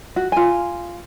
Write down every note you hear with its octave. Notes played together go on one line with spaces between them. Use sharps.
F#4
F4 G#5